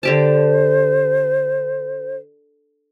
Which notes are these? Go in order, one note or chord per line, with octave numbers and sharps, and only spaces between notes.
D3 G4 C5 A5